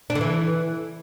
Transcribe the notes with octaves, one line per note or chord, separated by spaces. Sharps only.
D4
D3
E3